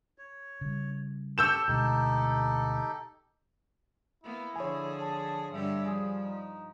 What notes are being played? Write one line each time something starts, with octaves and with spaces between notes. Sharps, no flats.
C#5
C#3 G3
G4 A4 C#6 E6 G6 E7
D2 B2 G#3 D#4 G4 A4
A#3 B3 E4
D3 F3 G#4 C#5 G#5
A5
G2 D3 G3 G4 E5
F3 G#4
D#4